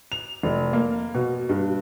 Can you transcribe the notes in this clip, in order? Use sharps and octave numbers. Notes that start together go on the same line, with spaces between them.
F7
F1
A#3
B2
G2